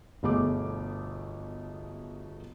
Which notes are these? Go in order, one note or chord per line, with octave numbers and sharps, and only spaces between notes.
G1 B2 A3 G#4 D6